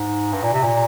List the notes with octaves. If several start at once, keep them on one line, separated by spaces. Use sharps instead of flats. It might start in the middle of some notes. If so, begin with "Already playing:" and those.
Already playing: G#2
G2
A#2
C3
A#2